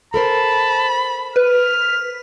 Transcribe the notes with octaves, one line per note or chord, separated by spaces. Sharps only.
A4 A#4 C5 A5 B5
B4 F6